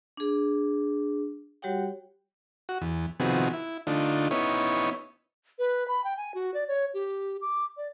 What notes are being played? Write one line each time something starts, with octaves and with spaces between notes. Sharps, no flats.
D4 G#4
G3 F#4 G4 C#5 F#5 G5
F#4
E2
C3 D#3 F3 B3 F#4 G#4
E4
D3 A3 D4 D#4 F4
B3 C#4 D#4 E4 C#5
B4
B5
G5
G#5
F#4
D5
C#5
G4
D6
D5